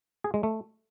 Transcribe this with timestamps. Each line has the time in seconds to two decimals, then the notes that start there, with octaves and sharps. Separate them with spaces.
0.24 G#4
0.34 G#3
0.43 A3